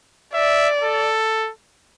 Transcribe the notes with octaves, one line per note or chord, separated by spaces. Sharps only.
D5 E5
A4